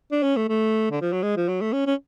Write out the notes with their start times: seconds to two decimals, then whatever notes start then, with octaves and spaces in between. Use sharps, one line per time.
0.12 D4
0.23 C#4
0.37 A3
0.49 A3
0.91 D3
1.01 F3
1.13 F#3
1.23 G#3
1.37 F3
1.49 F#3
1.61 A3
1.73 C#4
1.87 C#4